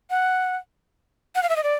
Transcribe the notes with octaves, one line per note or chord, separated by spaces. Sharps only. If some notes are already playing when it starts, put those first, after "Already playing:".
F#5
F#5
F5
E5
D#5
D5